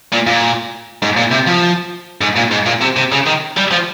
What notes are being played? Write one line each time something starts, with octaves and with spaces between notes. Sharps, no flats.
A#2
A#2
G#2
A#2
C3
F3
G#2
A#2
G#2
A#2
C3
C3
C#3
D#3
G3
F3